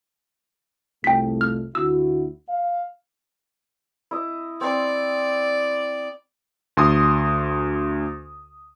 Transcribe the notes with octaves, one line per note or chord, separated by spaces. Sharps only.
C2 F2 A3 G5 B6
F6
D2 E4 F#4 E6
F5
E4 D#5
C4 D5 C6
D2 C6 D#6